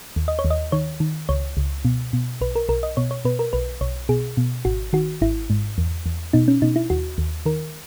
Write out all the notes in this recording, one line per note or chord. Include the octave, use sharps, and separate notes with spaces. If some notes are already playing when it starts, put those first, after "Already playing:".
D#2
D#5
C#5
D#2
D#5
D#3 C#5
D#3
C#2 C#5
C#2
B2
B2
B1 B4
A#4
B1 A#4
D#5
B2 C#5
C#5
B2 B4
A#4
B1 B4
B1 C#5
B2 G#4
B2
G#1 F#4
D#3 F#4
G#1 E4
G#2
E2
E2
B2 D#4
C#4
B2 D#4
E4
D#2 F#4
D#2
D#3 A#4